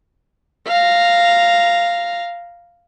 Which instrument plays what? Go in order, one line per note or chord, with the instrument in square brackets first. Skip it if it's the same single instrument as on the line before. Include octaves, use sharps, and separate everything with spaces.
[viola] F5 A#5